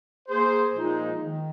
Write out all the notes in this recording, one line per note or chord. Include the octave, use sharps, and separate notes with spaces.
A#3 G#4 C5
A#2 F3 G#3 D#4
D#3